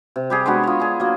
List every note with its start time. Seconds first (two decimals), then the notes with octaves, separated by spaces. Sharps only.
0.16 C3
0.30 G3 G4 G#4
0.46 G#3 B3 D4 F#4
0.64 F4 C#5
0.80 D4 G#4
1.00 F#3 A#3